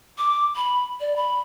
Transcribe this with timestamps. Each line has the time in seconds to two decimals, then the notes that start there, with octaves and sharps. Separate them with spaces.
0.18 D6
0.56 B5
1.01 D5
1.16 B5